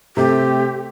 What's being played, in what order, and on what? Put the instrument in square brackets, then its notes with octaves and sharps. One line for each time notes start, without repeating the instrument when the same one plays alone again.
[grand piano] C3 A3 C4 [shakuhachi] G4